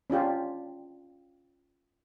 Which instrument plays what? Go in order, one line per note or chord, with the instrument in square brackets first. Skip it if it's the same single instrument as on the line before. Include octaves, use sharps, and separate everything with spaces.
[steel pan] C#4 D4 F4 G4